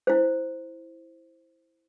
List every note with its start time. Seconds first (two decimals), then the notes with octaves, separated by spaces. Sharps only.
0.07 E4 C5